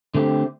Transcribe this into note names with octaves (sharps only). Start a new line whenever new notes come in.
D3 A3 C4 G4